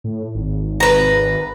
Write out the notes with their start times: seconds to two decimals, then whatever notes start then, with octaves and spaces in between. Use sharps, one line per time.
0.04 A2
0.35 G#1
0.80 B4 A#5